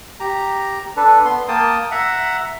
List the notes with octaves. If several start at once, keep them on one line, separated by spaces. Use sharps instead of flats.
G4 A#5
D4 A4 B4
B3 C6
A#3 G5 A5 D#6
E5 F#5 A#5